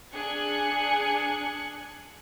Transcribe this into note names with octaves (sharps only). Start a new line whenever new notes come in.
D4 G#4 G#5 F#6 G#6 C#7